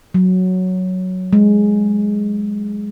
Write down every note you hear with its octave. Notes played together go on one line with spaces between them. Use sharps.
F#3
G#3